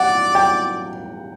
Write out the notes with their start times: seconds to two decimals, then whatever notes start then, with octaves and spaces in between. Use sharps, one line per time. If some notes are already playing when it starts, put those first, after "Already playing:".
Already playing: D5 F#5
0.35 G5